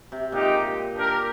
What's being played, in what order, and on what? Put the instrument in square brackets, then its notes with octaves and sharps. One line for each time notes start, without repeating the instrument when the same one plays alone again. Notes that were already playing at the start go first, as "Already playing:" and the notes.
[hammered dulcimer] C3
[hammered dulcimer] A#2 [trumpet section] G#3 D#4 G4
[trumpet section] D4 G4 A#4